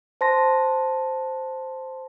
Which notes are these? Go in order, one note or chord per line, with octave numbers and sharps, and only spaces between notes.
C5 A5 C6 A#6